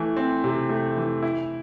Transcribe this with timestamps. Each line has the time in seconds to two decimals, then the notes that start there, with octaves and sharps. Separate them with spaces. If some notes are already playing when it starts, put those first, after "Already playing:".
Already playing: E3 A3
0.17 C4
0.44 C3
0.69 A3
0.97 E3
1.22 E4